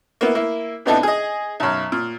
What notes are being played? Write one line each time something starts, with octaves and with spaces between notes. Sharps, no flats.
A#3 B3 E4
A#3 E4
A2 C3 B3 D4 D#4 A4
G#4 D#5
B1 F#2
A#2